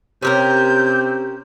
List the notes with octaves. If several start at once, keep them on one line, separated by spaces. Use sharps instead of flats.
C3 C#4 G4 A#4 G6